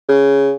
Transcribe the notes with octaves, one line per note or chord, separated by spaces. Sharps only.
C#3